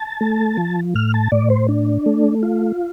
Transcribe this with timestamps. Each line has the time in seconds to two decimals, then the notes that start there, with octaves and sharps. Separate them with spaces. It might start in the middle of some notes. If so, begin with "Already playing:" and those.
Already playing: A5
0.21 A3
0.58 F3
0.95 A2 F6
1.14 A5
1.32 A2 D5
1.50 C5
1.69 D4
2.06 A3
2.43 F4